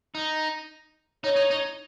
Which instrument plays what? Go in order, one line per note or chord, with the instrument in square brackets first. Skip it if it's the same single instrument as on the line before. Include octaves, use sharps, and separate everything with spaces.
[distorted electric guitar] D#4
[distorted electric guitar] D#4 [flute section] C#5
[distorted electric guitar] D#4
D#4